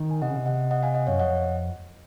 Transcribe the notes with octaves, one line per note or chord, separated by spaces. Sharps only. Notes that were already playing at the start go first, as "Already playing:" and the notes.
Already playing: D#3
G#5
C3 D#5 F#5
C#3
C3
D#5 F#5
D#5 F#5
F5 G#5
D#5 F#5
F#2 C#5 F5
F2 D#5 F#5